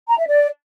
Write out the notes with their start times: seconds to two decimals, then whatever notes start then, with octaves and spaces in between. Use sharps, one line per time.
0.08 A#5
0.18 E5
0.28 D5